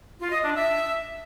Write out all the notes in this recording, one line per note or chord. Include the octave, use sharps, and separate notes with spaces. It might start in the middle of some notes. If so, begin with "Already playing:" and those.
F4
D#5
D4
E5